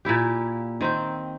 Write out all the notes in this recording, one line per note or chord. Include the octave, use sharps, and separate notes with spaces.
A#2 A#3 E4 G4
D#3 C4 E5 G5